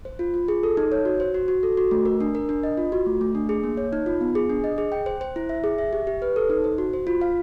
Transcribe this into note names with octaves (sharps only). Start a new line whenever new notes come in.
C5
F4
F4
G#4
A4
D#4
C#5
F#4
C5
F#4
F#4
A4
F#4
A3
A#4
D4
A#4
D4
D#5
F4
F#4
A3
A3
D4
G#4
A#3
C#5
D#4
F4
B3
G#4
D4
D#5
G#4
G5
C5
C5
E4
E5
G#4
E5
G4
G4
B4
A4
D#4
C5
F#4
C5
F4
F5